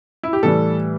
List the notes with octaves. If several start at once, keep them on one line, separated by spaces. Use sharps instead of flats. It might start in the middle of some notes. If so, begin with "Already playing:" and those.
E4
G4
A2 E3 G3 A4